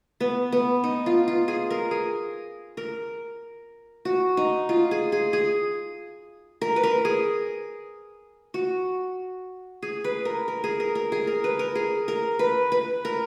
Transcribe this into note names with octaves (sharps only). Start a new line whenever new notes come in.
B3
B3
D#4
F4
F4
G#4
A#4
G#4
A#4
F#4
D#4
F4
G#4
G#4
G#4
A#4
B4
A#4
G#4
F#4
G#4
B4
A#4
A#4
G#4
A#4
A#4
G#4
A#4
B4
A#4
G#4
A#4
B4
B4
A#4